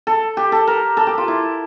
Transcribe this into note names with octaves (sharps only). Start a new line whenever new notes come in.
A4
G4
A4
A#4
A4
G4
F4
E4